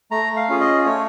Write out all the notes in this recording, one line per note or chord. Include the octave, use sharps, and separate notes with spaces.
A3 A#5
F5
C#4 F4 G#4
D#5
A3 C#5